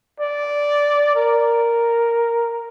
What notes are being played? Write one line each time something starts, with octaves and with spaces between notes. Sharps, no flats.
D5
A#4